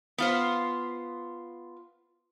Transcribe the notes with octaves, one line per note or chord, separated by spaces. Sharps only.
B3 F4 C5